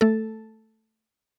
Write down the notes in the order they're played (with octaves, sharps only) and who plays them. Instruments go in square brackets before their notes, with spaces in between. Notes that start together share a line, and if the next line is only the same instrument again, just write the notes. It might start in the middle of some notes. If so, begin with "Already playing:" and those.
[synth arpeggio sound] A3 A4